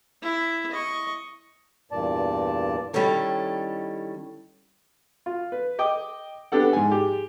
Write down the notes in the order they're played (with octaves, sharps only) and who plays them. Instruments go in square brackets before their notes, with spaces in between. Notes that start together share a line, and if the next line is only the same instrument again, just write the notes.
[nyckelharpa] E4 E5
D#5 C#6
[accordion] E2 G2 A#2 D5 A5
[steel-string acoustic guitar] D#3 G3 C#4 E4 A4 C#5
[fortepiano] F4
B4
D#5 G5 D6 D#6
B3 D4 G4 A4 F#5
G#2 G#5
G4 G#4